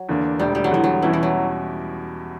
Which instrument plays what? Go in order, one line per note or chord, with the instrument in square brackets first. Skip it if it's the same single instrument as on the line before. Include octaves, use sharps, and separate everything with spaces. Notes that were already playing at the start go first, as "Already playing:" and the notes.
Already playing: [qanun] F#3
[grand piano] E2 D3 A#3 D4
[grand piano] E1 D2 D3 [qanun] G3
[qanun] G3
F#3
[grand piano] E1 E2 D3 G3 [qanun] E3
[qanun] F#3
[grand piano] E2 B2 G3 C#4 E4 [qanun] E3
[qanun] E3
F#3